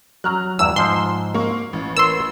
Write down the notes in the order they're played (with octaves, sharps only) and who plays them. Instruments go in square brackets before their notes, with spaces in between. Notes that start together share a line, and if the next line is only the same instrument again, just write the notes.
[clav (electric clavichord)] F#3 [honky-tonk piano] A#5 F6 F#6
[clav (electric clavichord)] E2 G2 E3 [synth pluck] E6
[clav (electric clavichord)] G#2 F3 [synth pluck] C6
[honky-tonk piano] A#3 C#6
A1
[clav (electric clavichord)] A#4 B4 C#5 [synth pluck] C6 E6